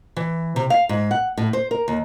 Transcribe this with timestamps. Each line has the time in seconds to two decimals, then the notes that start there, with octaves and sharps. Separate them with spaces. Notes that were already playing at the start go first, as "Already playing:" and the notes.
0.17 E3
0.56 C3
0.70 F5
0.89 G#2
1.11 F#5
1.37 A2
1.53 C5
1.71 A#4
1.88 D#2